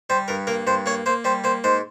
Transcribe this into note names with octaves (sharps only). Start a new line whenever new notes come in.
G3 C5
G2 A#4
A#3 A#4
G2 C5
A#3 C#5
A#3 C5
G3 C5
A#3 C5
G#2 C5